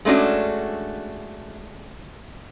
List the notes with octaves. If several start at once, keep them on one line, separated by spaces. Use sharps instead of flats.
G#3 A3 C#4 D4 F#4